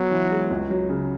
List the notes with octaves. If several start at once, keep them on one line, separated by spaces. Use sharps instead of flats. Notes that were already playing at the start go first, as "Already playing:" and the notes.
Already playing: F#3 B3
E3
G#3
C#2
F#3
C#3